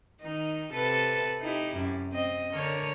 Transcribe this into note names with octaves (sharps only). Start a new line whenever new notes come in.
D#3 D#4
C3 A4 B4
D#4 E4 G4
F#2
C4 D#5
D3 A#4 C#5